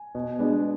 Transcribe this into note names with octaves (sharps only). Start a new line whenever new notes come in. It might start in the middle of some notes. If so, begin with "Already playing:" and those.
Already playing: G#5
B2
G#3 B3 D4